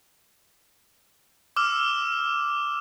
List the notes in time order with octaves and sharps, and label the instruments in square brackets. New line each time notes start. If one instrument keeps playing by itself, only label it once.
[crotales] D6 E6 F6 E7